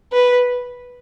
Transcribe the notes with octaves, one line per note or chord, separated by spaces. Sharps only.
B4